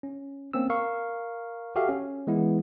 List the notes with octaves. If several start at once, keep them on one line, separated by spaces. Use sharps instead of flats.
C#4
A#3 C4 C#4 E6
A#4 F5 C#6
F#4 G4 A4 E5 F5
C#4
E3 G#3 B3 E4